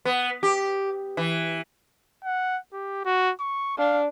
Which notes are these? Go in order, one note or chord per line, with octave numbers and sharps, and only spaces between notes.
B3
G4
E3
F#5
G4
F#4
C#6
D4 F5